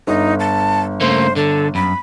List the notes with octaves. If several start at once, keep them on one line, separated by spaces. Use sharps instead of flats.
G1 D#4
A5
C#3 A3 A#3 C5
D3 A4
F#2 B5